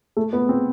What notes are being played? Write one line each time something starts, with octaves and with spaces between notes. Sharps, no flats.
A3
B3
C4